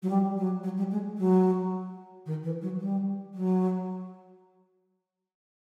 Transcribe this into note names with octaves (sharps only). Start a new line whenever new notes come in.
F#3
G3
F#3
F#3
G3
G#3
F#3
D#3
E3
F#3
G3
F#3